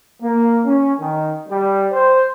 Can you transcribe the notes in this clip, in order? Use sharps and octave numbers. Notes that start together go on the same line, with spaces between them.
A#3
C#4
D#3
G3
C5